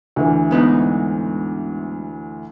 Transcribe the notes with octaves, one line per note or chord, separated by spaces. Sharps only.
D2 E3
G#2 B3 D#4